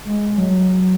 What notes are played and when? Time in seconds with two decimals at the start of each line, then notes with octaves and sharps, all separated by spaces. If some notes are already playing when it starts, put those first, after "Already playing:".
0.05 G#3
0.38 F#3